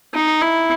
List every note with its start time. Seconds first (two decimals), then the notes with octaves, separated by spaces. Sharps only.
0.14 D#4
0.41 E4